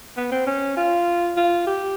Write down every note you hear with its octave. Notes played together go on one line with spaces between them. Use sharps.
B3
C4
C#4
F4
F4
G4